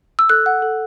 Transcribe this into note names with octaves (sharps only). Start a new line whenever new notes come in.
E6
A4 F#6
F#5
A4